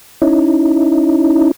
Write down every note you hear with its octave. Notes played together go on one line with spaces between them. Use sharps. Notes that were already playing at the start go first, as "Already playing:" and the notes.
C#4 D#4 E4